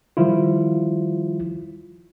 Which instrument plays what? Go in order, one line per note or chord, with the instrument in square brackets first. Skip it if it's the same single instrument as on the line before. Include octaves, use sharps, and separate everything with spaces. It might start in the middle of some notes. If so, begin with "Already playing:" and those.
[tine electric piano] D#3 F3 G3 E4 F4